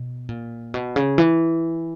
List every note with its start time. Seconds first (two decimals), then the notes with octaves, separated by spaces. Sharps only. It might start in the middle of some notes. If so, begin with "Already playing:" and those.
Already playing: B2
0.29 A#2
0.74 B2
0.96 C#3
1.18 E3